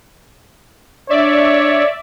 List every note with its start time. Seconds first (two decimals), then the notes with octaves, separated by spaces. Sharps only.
1.10 D4 C#5 D5 E5